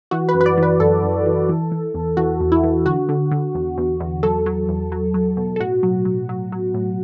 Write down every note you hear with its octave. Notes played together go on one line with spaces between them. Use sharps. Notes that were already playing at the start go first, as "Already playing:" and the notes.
E3 F#4
B4
F#2
B4
D5
E3
B4
F#2 A4
F#2
E3
E3
E3
E2
E3 F#4
E2
E4
E3
D3 F#4
D3
D3
E2
E2
E2
F#3 A4
F#3
E2
F#3
F#3
B2
A4
A2 F#4
F#3
F#3
F#3
F#3
A2